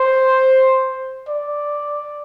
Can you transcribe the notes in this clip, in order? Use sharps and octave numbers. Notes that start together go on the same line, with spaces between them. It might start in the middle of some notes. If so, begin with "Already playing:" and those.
Already playing: C5
D5